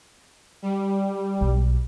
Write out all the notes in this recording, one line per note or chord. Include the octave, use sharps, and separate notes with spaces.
G3
B1